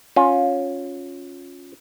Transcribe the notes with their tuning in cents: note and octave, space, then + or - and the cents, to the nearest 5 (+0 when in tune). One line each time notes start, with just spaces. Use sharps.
C#4 +0 F4 +25